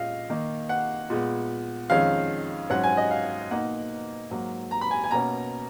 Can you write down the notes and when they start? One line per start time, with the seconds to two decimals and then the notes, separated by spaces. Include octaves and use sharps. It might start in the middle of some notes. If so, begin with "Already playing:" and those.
Already playing: A#2 G#3 C#4 D#5 F5
0.30 D#3 A#3 D#4
0.69 F#5
1.10 A#2 G#3 B3
1.90 F2 D#3 G#3 C#4 F5
2.70 G#2 F#3 C#4 F#5
2.84 G#5
2.97 D#5
3.11 F5
3.51 B2 A#3 D#4 F#5
4.31 G#2 F#3 A#3
4.71 A#5
4.81 B5
4.91 G#5
5.04 G#5
5.11 B2 A#3 C#4 A#5